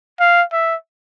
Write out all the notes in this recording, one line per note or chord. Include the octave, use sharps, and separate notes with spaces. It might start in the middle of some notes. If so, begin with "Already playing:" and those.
F5
E5